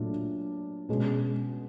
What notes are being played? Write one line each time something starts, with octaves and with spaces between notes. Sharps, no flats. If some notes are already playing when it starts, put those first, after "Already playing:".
Already playing: A#2 F#3 A3 D4 F4
B2 G#3 C#4